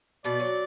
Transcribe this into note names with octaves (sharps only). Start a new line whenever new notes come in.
B2 B3 D5
F#3